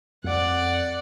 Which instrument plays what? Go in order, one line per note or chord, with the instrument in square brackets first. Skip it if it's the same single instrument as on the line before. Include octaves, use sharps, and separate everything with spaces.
[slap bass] F2 [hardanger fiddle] D5 F#5